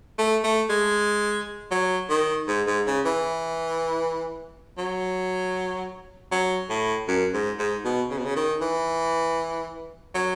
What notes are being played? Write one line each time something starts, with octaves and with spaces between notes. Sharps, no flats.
A3
A3
G#3
F#3
D#3
G#2
G#2
C#3
E3
F#3
F#3
A2
F#2
G#2
G#2
B2
C#3
B2
C#3
D#3
E3
F#3